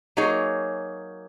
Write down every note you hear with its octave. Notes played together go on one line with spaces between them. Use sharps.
F#3 A#3 D#4 G#4 C#5